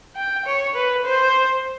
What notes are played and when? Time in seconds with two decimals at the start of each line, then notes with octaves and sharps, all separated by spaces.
0.16 G5
0.46 C#5
0.75 B4
1.05 C5